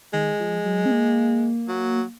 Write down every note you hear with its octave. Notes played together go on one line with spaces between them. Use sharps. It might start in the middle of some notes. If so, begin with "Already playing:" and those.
D#3 G#3
F3
F#3
C4
A#3
F#3